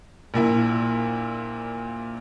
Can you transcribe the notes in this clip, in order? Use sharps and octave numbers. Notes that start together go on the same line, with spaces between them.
A#1 A#2 E4